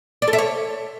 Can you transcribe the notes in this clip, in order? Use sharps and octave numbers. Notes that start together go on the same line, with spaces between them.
D5
A4
E5
C#5